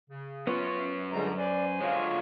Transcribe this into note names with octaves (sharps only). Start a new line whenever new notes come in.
C#3
F#2 B3 C#4 F4 C#5
C#2 D3 G3 G#3 A#5
B4 C5 D5 G#5
D3 F#3 G#3 F4 C#5